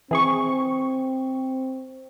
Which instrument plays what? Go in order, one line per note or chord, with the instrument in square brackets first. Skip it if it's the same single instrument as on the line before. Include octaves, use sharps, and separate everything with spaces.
[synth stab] E3 G#4 C#6 [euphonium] C4